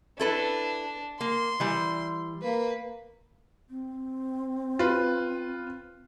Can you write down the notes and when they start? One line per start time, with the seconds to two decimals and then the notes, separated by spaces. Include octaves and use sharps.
0.19 D4 E4 A4 B4
1.20 A#3 C6
1.60 E3 G3
2.42 A#3 B4
3.70 C4
4.79 F4 B4